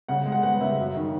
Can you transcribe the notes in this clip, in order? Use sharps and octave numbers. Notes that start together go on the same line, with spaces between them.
C#3 F#5
G#3
F#5
B3 F#5
C#3 E5
F#2
D#3